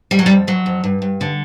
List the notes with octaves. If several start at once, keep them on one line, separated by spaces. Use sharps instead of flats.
F2 G3
F#3
G3
F2
F2 F#3
F2
G2
G2
D3